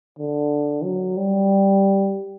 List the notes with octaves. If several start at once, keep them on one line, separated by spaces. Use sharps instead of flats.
D3
F#3
G3